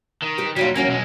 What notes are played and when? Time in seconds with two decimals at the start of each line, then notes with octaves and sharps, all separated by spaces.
0.22 D#3
0.38 G4 B4
0.56 D#2 F#3 G3 D#4 F4
0.75 E2 F#3 A#3 C#4
0.87 B1 G#3